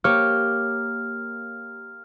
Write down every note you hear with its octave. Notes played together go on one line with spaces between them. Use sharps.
A#3 G4 C#5 F6